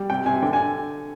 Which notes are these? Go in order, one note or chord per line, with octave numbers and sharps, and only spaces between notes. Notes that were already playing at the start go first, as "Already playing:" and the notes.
Already playing: G3
C3 G5
C3 G#5
D3 G5
G#5